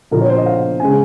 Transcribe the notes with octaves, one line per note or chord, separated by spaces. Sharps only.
A#1 A#2 F3 A#3 A#4
C#5
C5
D#5
F5
C#3 G#3 G#5